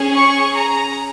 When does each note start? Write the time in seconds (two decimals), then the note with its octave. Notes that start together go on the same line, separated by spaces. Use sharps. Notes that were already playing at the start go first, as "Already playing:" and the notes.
Already playing: C#4 G#4
0.14 C#6
0.56 A#5